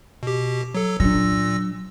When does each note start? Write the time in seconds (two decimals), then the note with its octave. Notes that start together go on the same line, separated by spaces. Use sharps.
0.23 B2 G4
0.74 F#3 A4
1.00 A#2 F#3 D4 E6 A#6